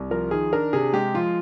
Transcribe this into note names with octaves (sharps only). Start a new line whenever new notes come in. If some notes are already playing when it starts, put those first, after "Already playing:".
Already playing: C2
F3 A#4
D#3 G#4
D4 A#4
C3 G#4
G#3 G4
F3 F4